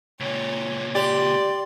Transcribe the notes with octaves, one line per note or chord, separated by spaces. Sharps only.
C#2 A#2 C#5
G4 D5 C6